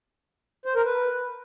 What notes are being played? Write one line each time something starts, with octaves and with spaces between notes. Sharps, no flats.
C5
A#4
B4